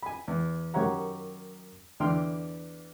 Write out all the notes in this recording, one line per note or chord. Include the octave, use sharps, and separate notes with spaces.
G#5 B5
E2
F#2 D#3 G4 C#5 F#5 A#5
E2 D3 E3 G5 C6 F6